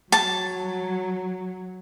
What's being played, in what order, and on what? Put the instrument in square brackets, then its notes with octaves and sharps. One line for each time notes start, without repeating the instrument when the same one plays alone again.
[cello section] F#3 [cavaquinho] A5